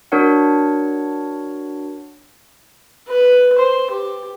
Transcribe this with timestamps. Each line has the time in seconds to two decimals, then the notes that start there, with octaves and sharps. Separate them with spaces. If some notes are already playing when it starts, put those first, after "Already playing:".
0.12 D4 F#4 A#4 C#5 F#5
3.08 B4
3.58 C5
3.91 G4